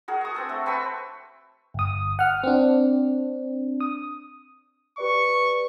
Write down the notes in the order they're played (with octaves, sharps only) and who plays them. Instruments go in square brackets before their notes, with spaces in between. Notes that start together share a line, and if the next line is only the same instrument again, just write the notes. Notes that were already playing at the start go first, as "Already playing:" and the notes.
[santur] F#4 G#4 A#4
C#6 D#6
C4 D4 A4
A3 A4
C4 B4 C#6 E6
[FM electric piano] G1 D#6
F#5 F6
C4 D4
D#6
[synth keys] G4 B4 D5 [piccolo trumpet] C#6